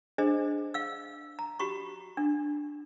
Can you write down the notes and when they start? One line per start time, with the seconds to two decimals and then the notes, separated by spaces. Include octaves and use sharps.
0.18 D4 G#4 C5 D#5
0.74 F5 E6
1.39 A#5
1.59 F#4 G4 B5 C#6
2.17 D4